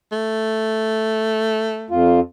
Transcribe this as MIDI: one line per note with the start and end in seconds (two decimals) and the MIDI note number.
0.12 1.99 57
1.90 2.20 41
1.90 2.20 65